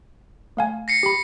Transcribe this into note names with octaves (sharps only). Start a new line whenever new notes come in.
A3 F5 G#5
A#6 C7 C#7
G4 B5